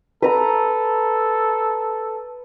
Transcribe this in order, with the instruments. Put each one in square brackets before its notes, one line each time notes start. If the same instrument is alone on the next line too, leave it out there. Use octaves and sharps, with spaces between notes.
[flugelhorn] A4 [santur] B4 A#5